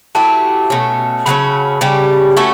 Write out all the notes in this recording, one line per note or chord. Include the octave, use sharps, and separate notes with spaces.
F#3 A3 E4 G4 A5
B2 A3 C#4
C#3 F#3 A3 C#4 B5
C#3 G3 C#4 G4
A3 C#4 F#4 A4 C#6